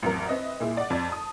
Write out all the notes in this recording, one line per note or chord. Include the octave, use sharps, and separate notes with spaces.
A1 F2 F#3 A#4
C4 B4 D#5 E5
A#2 E4 G#4
D5 D#5 F#5
F2 D5
A5 D#6